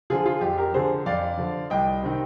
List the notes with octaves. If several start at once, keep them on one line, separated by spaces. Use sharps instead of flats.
D3 F3 F4 G#4
F4 G#4
F2 G4
G4 A#4
D3 F3 G#4 C5
F2 D5 F5
D3 F3
C2 D#5 G5
C3 D#3